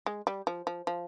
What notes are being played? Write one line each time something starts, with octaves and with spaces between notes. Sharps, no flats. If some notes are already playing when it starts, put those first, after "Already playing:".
G#3
G3
F3
F3
F3